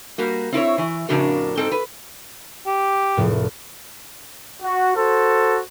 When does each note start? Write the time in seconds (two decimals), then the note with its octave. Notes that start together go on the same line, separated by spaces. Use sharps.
0.18 G3 A#3 F#4
0.52 C4 E4 B4 C#5
0.78 E3
1.09 F2 A2 C#3 D4 F#4 A#4
1.57 G#2 C4 A4 G5
1.72 B4
2.66 G4
3.17 F1 A2
4.62 F#4
4.97 F#4 A4 C5